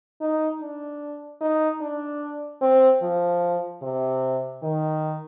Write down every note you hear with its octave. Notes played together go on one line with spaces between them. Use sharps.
D#4
D4
D#4
D4
C4
F3
C3
D#3